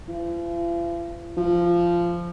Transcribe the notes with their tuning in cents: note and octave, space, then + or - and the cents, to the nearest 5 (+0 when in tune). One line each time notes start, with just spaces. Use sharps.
F3 -45
F3 -15